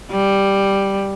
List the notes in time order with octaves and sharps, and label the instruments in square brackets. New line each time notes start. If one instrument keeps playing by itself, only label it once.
[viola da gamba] G3